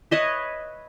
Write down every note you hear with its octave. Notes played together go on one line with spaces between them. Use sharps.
B4 C#5 D#5 E5